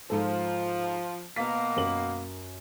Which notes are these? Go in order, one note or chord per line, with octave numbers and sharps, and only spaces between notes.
G#2 F3 A4
B2 A#3 B3 F5 B6
F#2 A#4 F#7